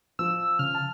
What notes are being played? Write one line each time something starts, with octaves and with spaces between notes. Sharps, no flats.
F3 E6
C#3 F6
A5